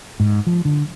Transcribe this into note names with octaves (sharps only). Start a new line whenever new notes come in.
G#2
F3
D3